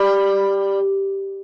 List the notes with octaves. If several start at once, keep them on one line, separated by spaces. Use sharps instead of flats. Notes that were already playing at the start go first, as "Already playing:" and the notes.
Already playing: G3